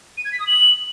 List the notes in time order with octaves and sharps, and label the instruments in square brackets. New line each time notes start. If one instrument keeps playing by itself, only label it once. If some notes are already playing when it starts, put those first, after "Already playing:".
[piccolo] D#7
G#6
B6
D#6
F#7